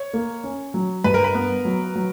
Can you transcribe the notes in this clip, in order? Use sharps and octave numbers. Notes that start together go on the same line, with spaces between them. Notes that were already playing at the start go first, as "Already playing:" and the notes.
Already playing: C#5
A#3
C#4
F#3
G2 B4
A#4
B4
B3
F#3
F#3